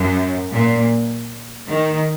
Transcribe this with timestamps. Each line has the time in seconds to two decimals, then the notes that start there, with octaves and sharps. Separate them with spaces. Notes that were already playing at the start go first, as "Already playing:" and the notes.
Already playing: F#2
0.52 A#2
1.69 D#3